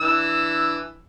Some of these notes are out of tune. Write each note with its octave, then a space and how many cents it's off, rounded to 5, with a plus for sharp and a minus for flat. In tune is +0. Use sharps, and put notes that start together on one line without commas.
E3 +0 D4 +0 E6 +5